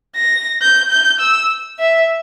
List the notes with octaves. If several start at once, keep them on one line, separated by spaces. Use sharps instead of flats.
A#6
G6
G6
E6
E5